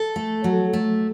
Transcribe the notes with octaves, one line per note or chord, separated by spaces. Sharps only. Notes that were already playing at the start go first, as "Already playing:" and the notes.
Already playing: A4
A3
F#3
A3